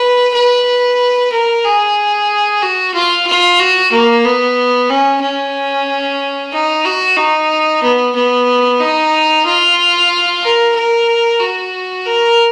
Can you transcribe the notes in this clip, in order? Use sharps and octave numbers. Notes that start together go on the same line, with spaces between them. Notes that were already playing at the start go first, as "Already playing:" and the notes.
Already playing: B4
B4
A#4
G#4
F#4
F4
F4
F#4
A#3
B3
C#4
C#4
D#4
F#4
D#4
B3
B3
D#4
F4
A#4
A#4
F#4
A#4